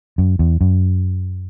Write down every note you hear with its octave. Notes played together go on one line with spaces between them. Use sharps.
F#2
E2
F#2